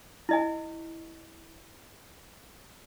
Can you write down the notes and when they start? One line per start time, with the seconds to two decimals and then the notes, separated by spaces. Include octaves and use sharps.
0.29 E4 D#5 G#5